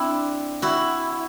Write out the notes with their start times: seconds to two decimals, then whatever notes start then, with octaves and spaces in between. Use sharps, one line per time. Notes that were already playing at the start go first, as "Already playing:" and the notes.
Already playing: C4 D4 E4
0.62 E4 F#4